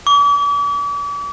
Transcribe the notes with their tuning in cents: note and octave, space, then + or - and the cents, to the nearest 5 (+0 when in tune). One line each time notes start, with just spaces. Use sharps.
D6 -40